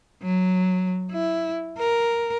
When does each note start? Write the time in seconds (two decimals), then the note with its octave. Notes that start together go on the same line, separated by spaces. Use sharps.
0.22 F#3
1.12 E4
1.78 A#4